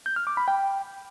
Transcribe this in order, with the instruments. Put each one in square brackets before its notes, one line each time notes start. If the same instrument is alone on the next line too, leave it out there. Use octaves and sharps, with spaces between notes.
[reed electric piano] G6
F6
D6
B5
G5